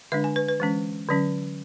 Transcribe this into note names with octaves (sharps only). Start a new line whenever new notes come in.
D3 G#3 D4 E5
G#5
B4
B4
E3 G#3 C#4
D3 F#3 C#4